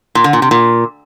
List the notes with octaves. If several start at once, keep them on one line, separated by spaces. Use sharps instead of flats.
A#2
D3
A#2
C3
A#2